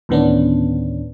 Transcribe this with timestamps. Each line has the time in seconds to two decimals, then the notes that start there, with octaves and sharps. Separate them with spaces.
0.09 D2 A2 D#3 B3 C#4 D4